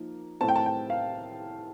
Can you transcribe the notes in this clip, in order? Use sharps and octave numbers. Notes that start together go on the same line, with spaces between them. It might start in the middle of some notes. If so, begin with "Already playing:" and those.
Already playing: F3 A#3 D#4
A2 A3 C4 A5
G5
A5
G5
F5